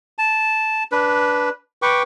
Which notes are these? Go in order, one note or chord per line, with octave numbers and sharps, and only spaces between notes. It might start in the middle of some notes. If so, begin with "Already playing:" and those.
A5
D4 B4
B4 G5 C#6 D6